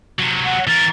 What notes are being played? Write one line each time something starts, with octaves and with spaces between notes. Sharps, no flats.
C3 F#3
F#5
E3 A#4 A6